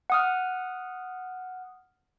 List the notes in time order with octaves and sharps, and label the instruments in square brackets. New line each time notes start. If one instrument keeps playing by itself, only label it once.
[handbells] F#5 D#6 F6